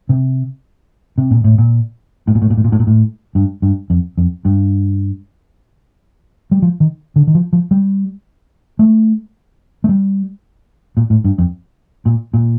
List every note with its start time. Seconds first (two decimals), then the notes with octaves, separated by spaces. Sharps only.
0.09 C3
1.18 C3
1.31 A#2
1.44 A2
1.58 A#2
2.28 A2
2.35 A#2
2.42 A2
2.50 A#2
2.57 A2
2.64 A#2
2.72 A2
2.80 A#2
2.87 A2
3.35 G2
3.62 G2
3.90 F2
4.17 F2
4.45 G2
6.51 G3
6.62 F3
6.80 D#3
7.16 D3
7.27 D#3
7.34 F3
7.53 F3
7.71 G3
8.79 A3
9.84 A3
9.89 G3
10.97 A#2
11.10 A2
11.24 G2
11.38 F2
12.06 A#2
12.34 A#2